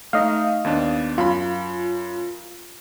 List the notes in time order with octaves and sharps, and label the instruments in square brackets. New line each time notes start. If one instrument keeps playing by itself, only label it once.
[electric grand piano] A3 D#4 [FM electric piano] D#5 F5
[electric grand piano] D#2 B3 D4
[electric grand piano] F#2 B5 [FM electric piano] F4